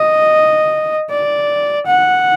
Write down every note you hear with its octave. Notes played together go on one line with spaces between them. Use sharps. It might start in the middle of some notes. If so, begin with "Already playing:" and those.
Already playing: D#5
D5
F#5